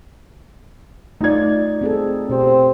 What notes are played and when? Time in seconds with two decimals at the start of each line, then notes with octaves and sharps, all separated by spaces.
1.21 A3 D#4 F4 D5 G#6
1.82 C4 G#4 A4
2.29 B2 C4 G4